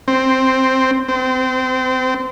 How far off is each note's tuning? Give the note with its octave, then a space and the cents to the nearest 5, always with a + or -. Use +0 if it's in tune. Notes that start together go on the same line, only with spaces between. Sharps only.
C4 +5
C4 -25